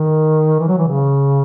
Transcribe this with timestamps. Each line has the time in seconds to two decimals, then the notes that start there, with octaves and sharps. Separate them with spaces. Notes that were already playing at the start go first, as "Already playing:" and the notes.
Already playing: D#3
0.59 E3
0.68 F#3
0.78 E3
0.88 C#3